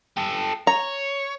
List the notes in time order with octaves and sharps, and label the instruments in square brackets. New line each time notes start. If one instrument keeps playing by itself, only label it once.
[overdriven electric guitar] G4 A4
[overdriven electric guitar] C#5 [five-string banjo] A#5